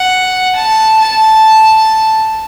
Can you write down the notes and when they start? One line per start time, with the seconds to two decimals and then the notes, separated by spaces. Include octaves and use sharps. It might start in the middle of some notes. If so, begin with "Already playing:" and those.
Already playing: F#5
0.56 A5
1.00 A5